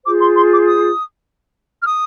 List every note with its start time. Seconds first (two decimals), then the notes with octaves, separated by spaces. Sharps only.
0.05 F4 G#4 C5 D6
0.21 C6
0.36 C6
0.51 D6
0.66 D#6
1.82 F6
1.86 D#6